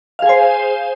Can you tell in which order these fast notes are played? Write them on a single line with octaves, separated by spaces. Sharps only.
F5 G#4 G#5 C5